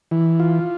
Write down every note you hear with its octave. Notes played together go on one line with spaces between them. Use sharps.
E3
F4